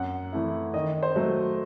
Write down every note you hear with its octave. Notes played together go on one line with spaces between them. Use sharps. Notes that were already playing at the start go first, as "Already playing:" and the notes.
Already playing: F#2 F#5
E3 A3 E4
D#3 D#5
C5
F#3 A3